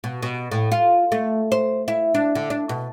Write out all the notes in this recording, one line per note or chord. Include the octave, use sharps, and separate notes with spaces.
B2
B2
A2
F4
A3
C5
E4
D4
D3
D4
B2